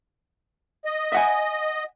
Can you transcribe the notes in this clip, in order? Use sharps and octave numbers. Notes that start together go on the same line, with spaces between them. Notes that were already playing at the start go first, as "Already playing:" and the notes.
D#5
E5 F#5 G#5